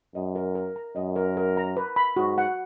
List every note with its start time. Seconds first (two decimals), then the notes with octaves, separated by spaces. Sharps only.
0.15 F#2 D#5
0.36 A#4
0.55 A#4
0.76 A#5
0.96 F#2 D#5
1.16 A#4
1.37 A#4
1.57 A#5
1.77 B4
1.96 B5
2.17 G#2 F#4
2.38 F#5